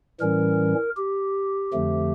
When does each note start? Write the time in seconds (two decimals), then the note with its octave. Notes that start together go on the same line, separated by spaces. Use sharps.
0.20 A2 E3 G3 C#4 A#4
0.97 G4
1.73 F2 D3 F3 A3